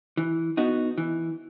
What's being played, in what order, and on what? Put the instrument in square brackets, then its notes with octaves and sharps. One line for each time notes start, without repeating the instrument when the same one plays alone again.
[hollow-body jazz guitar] E3
B3 D#4 F#4
E3